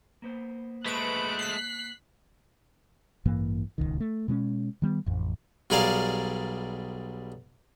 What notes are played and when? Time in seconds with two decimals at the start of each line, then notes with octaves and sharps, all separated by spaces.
0.22 A#3 B3 C5
0.86 G#3 A3 B4 C#6 F#6 D7
1.39 B6 C7
3.25 A1 G2 E3 A#3
3.78 D#1 G#1 C#2 D#3
4.00 A3
4.28 B2 G#3 B3 C#4
4.82 D#3 G3 B3
5.06 A1 F2
5.70 B1 G3 G#4 A#4 D5 F5